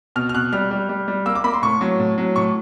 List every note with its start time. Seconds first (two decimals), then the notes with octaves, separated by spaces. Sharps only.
0.16 B2 F6
0.29 F6
0.34 B2 F#6
0.53 G3 F6
0.71 G3
0.89 G3
1.08 G3
1.26 A#3 E6
1.35 D6
1.44 A#3 B5
1.54 C6
1.63 A2 C#6
1.81 F#3
2.00 A2
2.18 F#3
2.36 A2 C#6